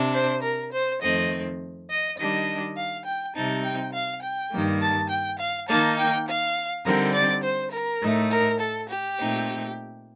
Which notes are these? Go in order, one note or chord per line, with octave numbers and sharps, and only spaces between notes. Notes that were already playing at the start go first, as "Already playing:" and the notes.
Already playing: C3 D4
C5
A#4
C5
F2 D#3 A3 C4 D#5
D#5
D#3 G3 D4 D#5
F5
G5
C3 G3 C4 D#4 A5
G5
F5
G5
G2 D#3 G3 A#3
A5
G5
F5
D#3 A#3 D#4 A5
G5
F5
D3 G3 C4 D#4 A#4
D5
C5
A#4
A2 A3 D#4
A#4
A4
G4
A#2 A3 C4 D#4